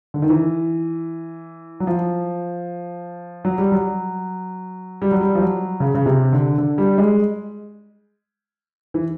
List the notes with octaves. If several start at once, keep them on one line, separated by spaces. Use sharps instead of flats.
D3
D#3
E3
F#3
F3
F#3
G3
F#3
G3
F#3
G3
F3
F#3
C#3
C#3
C3
D3
D3
G3
G#3
E3